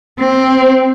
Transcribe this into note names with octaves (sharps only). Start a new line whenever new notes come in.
C4